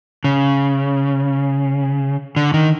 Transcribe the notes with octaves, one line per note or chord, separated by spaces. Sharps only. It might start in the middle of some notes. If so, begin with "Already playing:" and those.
C#3
D3
D#3